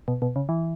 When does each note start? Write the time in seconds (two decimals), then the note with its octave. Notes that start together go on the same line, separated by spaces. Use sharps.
0.08 B2
0.22 B2
0.36 C#3
0.49 E3